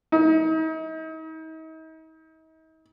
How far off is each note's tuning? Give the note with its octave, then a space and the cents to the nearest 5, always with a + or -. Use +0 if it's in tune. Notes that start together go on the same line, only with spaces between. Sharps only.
D#4 +40